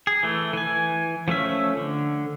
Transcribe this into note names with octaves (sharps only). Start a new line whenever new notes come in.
G#4
E3 A3
E3 G#5
F3 A3 C#4 E5
D3